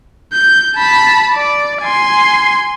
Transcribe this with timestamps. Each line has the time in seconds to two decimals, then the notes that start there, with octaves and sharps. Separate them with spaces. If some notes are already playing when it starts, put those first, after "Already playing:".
0.33 G6
0.76 A5 B5
1.34 D5
1.82 G#5 C6